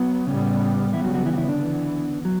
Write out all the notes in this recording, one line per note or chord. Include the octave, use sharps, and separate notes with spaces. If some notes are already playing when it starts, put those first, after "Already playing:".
Already playing: F#3 B3
A2 C#3 G3 B3 C#4
C#3 E3 G3 B3 E4
F#3 F#4
F#3 F#4
E3 E4
F#4
E3 E4
D3 D4
E3 B3
F#3